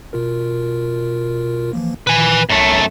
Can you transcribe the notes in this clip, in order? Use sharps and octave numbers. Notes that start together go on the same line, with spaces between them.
B2 F4 A#4
E3 F3 A#3
A#2 D#3 E3 B4 G#5
C2 F#2 A3 C#5 C7